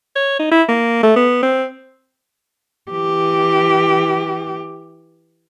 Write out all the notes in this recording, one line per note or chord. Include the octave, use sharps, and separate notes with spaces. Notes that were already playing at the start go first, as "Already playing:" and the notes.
C#5
D#4
E4
A#3
A3
B3
C4
E3 G4